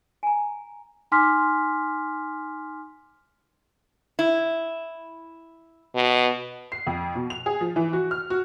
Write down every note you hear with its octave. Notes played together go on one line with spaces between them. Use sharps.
G#5 A#5
D#4 G#5 C6 D6 F6 B6
E4
B2
C7
F2
B2
F7
G#4
F3
E3
F#4
F6
F#4